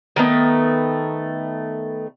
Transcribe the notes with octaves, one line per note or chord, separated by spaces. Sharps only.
D#3 A3 B3